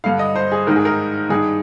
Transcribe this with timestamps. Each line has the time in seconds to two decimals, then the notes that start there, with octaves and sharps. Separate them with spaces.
0.04 G2 D3 F5
0.19 D#5
0.36 C5
0.52 G#4
0.67 G#2 D#3 A#4
0.76 G#4
0.85 A#4
1.29 G2 D#3 G#4